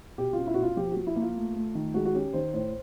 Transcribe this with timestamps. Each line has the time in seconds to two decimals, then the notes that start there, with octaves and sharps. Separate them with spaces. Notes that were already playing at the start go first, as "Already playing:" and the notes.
0.18 B2 G4
0.33 C#4 F4
0.47 E4
0.54 F#4
0.57 B2
0.63 F4
0.77 F3 G4
0.92 F3 F#4
1.07 E4
1.16 A#3
1.22 F4
1.36 A3
1.56 A3
1.75 D#3
1.94 G#3 F#4
2.05 F#4
2.15 C#4 G4
2.33 D#3 C5
2.53 A2 C5